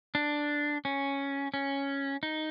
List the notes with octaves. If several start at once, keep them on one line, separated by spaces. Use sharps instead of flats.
D4
C#4
C#4
D#4